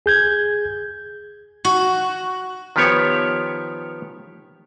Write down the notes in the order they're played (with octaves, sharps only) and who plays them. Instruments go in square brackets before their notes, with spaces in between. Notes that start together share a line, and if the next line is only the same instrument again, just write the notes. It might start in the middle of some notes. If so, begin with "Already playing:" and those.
[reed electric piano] G#4 G6 G#6
[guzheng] F#4
[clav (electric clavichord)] D#3 F3 B3 G4 C#5